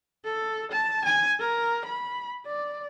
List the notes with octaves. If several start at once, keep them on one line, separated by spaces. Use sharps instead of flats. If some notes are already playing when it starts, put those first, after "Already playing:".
A4
A5
G#5
A#4
B5
D5